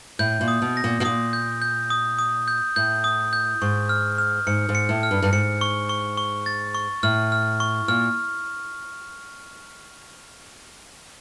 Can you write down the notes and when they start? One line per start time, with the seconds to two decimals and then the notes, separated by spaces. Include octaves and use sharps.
0.19 A2 G6
0.41 A#2
0.48 D#6
0.62 B2
0.77 A#6
0.84 A#2
1.00 B2
1.05 A#2 D#6
1.33 G6
1.62 G6
1.90 D#6
2.19 D#6
2.48 G6
2.76 A2 G6
3.04 D#6
3.33 G6
3.62 G#2 C#6
3.89 F6
4.18 F6
4.47 G#2 C#7
4.69 G#2
4.75 C#7
4.89 A2
5.03 F6
5.11 G2
5.22 G2
5.33 G#2 C#7
5.61 C#6
5.89 C#6
6.17 C#6
6.46 A6
6.75 C#6
7.03 A2 F6
7.32 F6
7.60 C#6
7.88 A#2 F6